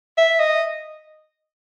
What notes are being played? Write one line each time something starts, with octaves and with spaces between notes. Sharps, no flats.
E5
D#5